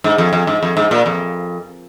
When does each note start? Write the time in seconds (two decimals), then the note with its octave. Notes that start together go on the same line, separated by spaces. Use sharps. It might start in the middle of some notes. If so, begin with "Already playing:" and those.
0.04 G#2
0.18 F2
0.33 F2
0.47 G#2
0.63 F2
0.77 G#2
0.91 A#2
1.06 F2